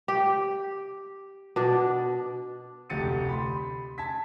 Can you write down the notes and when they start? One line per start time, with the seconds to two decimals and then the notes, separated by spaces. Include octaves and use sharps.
0.08 G4
1.56 B2 D4
2.90 F1 D2 G4 A6 C#7 D#7
3.29 B5 C6
3.98 A5 G#6 B6